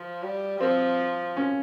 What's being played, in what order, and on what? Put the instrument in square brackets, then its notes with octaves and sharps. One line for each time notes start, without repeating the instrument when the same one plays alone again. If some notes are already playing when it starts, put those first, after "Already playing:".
Already playing: [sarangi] F3
G3
[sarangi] F3 [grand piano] C4
[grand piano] C#4